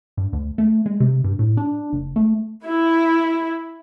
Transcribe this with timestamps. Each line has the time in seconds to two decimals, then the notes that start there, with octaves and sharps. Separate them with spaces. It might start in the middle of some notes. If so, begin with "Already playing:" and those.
0.17 G2
0.33 D2
0.58 A3
0.86 G#3
1.00 C3
1.24 G2
1.39 A2
1.57 D4
1.93 F#1
2.16 A3
2.65 E4